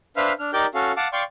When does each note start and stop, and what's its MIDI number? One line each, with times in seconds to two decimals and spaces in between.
0.17 0.32 62
0.17 0.32 71
0.17 0.32 72
0.17 0.32 76
0.17 0.32 77
0.17 0.32 89
0.39 0.51 62
0.39 0.51 89
0.53 0.66 63
0.53 0.66 67
0.53 0.66 70
0.53 0.66 74
0.53 0.66 86
0.53 0.66 91
0.74 0.92 61
0.74 0.92 66
0.74 0.92 69
0.74 0.92 77
0.97 1.08 77
0.97 1.08 78
0.97 1.08 81
0.97 1.08 86
1.13 1.23 74
1.13 1.23 77
1.13 1.23 79
1.13 1.23 84
1.13 1.23 85